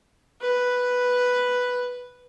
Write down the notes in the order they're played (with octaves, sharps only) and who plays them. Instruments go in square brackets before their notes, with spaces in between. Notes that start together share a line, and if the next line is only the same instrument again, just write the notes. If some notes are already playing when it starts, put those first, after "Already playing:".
[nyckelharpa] B4